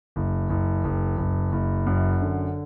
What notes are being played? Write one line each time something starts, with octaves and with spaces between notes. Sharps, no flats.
F#1
F#1
F#1
F#1
F#1
F#2
D3